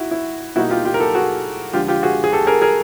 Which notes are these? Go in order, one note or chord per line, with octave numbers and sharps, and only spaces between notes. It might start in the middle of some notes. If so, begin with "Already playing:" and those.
Already playing: D#4 E4 F#4
E4
B2 G3 A#3 D#4 E4 F#4
F4 G4
F4 G4
A#4
G4 A4
F#4 G#4
D3 F3 G#3 F4 G4
F4 G4
F#4 G#4
G#4
G4 A4
G#4 A#4
G#4 A#4